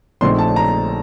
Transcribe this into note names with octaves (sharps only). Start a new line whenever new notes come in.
A#1 A#2 A3 C4 D#4 C6
A5
A#5